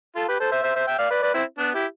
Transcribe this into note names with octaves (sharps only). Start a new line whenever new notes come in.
F4 A4
G4 B4
A4 C5
C5 E5
C5 E5
C5 E5
E5 G5
D5 F5
B4 D5
B4 D5
C4 E4
B3 D4
E4 G4